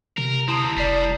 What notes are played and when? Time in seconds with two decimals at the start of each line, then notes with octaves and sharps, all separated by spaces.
0.18 C3 A#4
0.48 D2 C4 E4 A5 A#5 C6 D#6
0.77 F1 G3 D5 C7